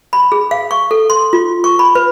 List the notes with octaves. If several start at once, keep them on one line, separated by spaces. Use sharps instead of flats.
B5
G#4
F5
C#6
A4
C6
F4
C#6
B5
B4